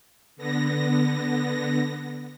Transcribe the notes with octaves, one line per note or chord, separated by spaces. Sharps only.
D3 B3 A#6